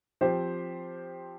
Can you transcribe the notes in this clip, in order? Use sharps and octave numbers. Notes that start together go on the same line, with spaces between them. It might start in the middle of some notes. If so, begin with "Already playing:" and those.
F3 C4 G4 C5